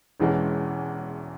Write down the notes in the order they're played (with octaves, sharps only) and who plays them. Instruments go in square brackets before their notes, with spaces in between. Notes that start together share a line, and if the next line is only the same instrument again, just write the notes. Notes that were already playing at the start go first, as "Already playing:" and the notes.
[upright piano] E1 E2 E3 G#3 C#4